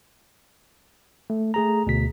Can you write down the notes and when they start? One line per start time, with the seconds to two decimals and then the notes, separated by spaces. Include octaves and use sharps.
1.30 A3
1.54 A3 G#4 A#5
1.87 D2 B2 B6